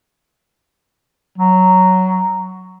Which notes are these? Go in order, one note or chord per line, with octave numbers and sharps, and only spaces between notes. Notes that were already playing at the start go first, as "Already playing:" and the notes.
F#3